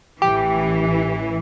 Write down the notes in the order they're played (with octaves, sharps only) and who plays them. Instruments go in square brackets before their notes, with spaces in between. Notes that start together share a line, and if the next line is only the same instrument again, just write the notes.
[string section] A1 E3 [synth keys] G4